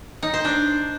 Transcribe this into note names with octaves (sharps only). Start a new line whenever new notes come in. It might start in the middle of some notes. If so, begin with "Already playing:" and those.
D#4
C5
D4